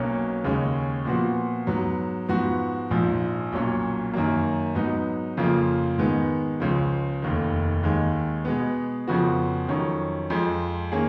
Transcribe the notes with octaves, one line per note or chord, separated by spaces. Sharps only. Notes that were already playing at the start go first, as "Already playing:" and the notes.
Already playing: B1 B2 F#3 A#3 C#4
D#2 C#3 G#3 C#4
A#2 F3 B3 F#4
G#2 F#3 B3
G#2 F3 B3 F#4
A#1 G#2 F3
B1 A#2 F#3 C#4
F#2 D#3 F#3 A#3
G#2 F#3 B3 D#4
F2 C#3 F3 A#3 F4
G#2 D#3 G#3 B3
C#2 C#3 F3
F1 D#2 D#3
D#2 D#3 G#3
B2 G#3 B3
F2 C#3 F3 B3 F#4
F2 D#3 F#3 C#4
F2 F3 G#3
D#3 A#3 C#4 G#4